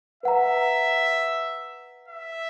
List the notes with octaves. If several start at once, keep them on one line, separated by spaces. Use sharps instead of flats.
B4 E5 F#5 A#5
E5